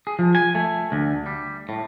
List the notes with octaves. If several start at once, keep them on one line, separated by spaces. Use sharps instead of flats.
G#4
F3
G#5
A3
D2
G3
A2